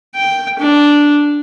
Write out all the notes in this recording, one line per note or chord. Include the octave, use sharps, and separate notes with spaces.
G5
D4